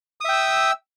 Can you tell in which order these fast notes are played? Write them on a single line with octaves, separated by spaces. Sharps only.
D#6 E5 G5 E6